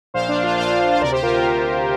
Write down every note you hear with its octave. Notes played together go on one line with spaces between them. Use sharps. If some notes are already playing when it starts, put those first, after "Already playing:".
A#1 A#2 C5 F5
D4
F4
A#1 A#2 C5 F5
C5
D2 C3 A#4 D5
G4 C5
F4 A#4
F4
D2 C3